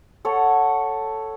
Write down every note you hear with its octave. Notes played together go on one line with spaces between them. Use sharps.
A4 C#5 F#5